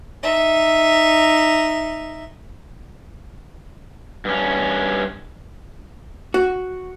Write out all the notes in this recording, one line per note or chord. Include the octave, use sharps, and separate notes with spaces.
D#4 E5
G2 C#4
F#4